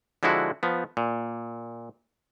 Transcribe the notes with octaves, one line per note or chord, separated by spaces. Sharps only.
D3 F3 G#3 E4 F#4
F3 B3
A#2